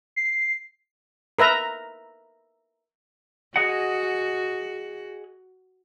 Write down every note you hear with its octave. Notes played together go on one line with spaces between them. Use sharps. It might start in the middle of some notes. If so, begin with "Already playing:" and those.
C7
A#4 B4 E5 A#5
F#4 G#4 D#5 F#5